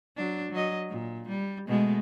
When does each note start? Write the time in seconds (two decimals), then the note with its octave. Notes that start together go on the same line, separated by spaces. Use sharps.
0.17 F#3 D4
0.52 F#3 D#5
0.89 A#2
1.29 G3
1.68 B2 G#3 A3